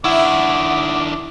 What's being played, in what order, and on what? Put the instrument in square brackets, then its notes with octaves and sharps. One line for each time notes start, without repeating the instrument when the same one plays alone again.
[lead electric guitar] D#3 D4 [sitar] E4 [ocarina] F#5 [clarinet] D6